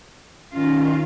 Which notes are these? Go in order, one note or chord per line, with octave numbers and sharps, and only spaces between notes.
D#3 C#4 F4